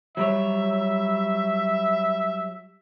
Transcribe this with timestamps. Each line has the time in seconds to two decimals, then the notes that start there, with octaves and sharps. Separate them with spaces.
0.17 F#3 G3 C#5 E5